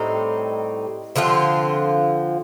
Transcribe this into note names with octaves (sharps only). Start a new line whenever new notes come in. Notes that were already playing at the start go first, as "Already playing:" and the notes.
Already playing: A2 G3 C4 D#4
D3 F3 C4 F4